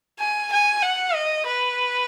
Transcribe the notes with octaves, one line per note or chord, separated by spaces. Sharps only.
G#5
G#5
F#5
D#5
B4